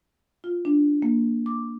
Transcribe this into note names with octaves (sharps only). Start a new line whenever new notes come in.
F4
D4
A#3
D6